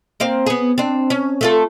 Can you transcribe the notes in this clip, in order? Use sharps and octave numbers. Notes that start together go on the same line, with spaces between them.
A#3 C4 F5
B3 G#4
C4 D4
C#4
A3 F4 A4